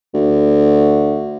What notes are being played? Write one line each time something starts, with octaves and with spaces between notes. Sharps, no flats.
D2